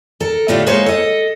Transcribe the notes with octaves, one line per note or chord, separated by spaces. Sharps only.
A4 A#4
A2 D3 A3 F4 G4 D5
G#3 A#3 D#4 C5 C#5
A4 D#5